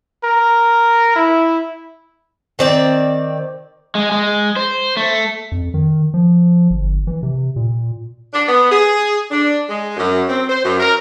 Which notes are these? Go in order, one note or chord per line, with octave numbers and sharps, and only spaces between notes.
A#4
E4
D#3 C4 D5
G#3
G#3
C5
A3
F2
D#3
F3
G1
E3
C3
A#2
D4
B3
G#4
D4
G#3
F#2
C4
C5
F#2
A#4